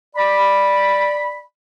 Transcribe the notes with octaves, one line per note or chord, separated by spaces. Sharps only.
D5 B5